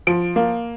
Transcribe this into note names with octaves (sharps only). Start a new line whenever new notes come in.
F3 D7
A#3